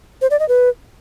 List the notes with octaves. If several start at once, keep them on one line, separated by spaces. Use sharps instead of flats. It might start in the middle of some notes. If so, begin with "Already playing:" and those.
C5
D5
D#5
B4